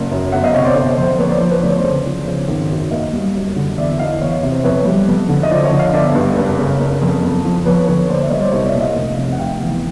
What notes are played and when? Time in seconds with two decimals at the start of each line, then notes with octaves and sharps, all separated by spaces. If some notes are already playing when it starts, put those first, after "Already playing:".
Already playing: F#1
0.11 F#2
0.32 G1 E5 F#5
0.43 D#5 F5
0.54 C3 C#5 D#5
0.64 C5 D5
0.75 G1 C5
0.98 F2 C5
1.18 A#3 B4 C#5
1.29 C5 D5
1.41 F3 C5
1.51 B4 C#5
1.62 D2 D5
1.70 C#5
1.77 C5 D5
1.83 C#3
2.06 F3
2.27 C#3
2.48 G#1
2.70 F#2
2.91 A#3 D#5 F5
3.13 G3
3.35 F#2
3.56 D3
3.78 E2 D5 E5
3.99 E3 D#5 F5
4.21 E2 C#5 D#5
4.43 C3
4.50 C5
4.64 F2 B4 C#5
4.85 G3
5.08 F2
5.29 D3
5.43 D#5
5.51 F3 C5 D5
5.64 C#5 D#5
5.72 D3
5.79 D#5 F5
5.93 G1 D5 E5
6.15 G2
6.37 F#1
6.58 C#3
6.80 F#1
7.01 F2
7.24 F2
7.45 F3
7.65 F2 B4 C#5
7.87 D3 B4 C#5
8.09 A#3 C5 D5
8.20 D5 E5
8.30 G3 C#5 D#5
8.41 C5 D5
8.52 C2 C#5 D#5
8.66 D5 E5
8.74 A#2
8.80 D#5 F5
8.96 F1
9.17 C3
9.32 F#5
9.38 F1 F5 G5
9.61 E2